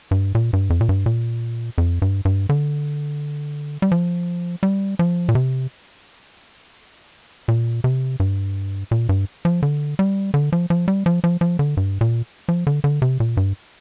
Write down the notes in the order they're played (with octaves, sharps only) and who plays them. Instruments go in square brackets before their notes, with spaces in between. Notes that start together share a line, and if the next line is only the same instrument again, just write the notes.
[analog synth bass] G2
A#2
G2
F2
A#2
G2
A#2
F2
G2
G2
D3
G3
F3
G3
F3
A#2
C3
A#2
C3
G2
A#2
G2
F3
D3
G3
D3
F3
F3
G3
F3
F3
F3
D3
G2
A#2
F3
D3
D3
C3
A#2
G2